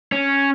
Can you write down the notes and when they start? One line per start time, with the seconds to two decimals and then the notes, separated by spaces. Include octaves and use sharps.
0.12 C#4